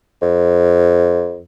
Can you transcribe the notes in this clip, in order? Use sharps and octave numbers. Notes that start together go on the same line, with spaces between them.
F2